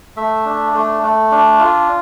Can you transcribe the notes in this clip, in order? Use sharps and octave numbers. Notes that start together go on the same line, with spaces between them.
A3 E5
D4
A3
A3
D4
F4